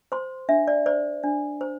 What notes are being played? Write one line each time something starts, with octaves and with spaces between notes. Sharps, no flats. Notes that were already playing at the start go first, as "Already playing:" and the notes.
C5 C6
D4 E5
D5
C5 D5
D4
C5